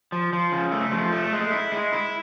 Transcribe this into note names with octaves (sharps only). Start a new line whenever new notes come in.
F3
F3
C#3
A3
F3
A3
G#3
E4
G#3
E4